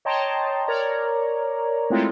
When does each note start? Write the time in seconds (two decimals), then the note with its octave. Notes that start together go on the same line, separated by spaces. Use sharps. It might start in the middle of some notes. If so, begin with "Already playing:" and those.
0.05 C#5 D#5 G5 A5 A#5 C6
0.68 A#4 C#5 D5 A#5
1.90 G#3 A3 C4 E4 F4 A4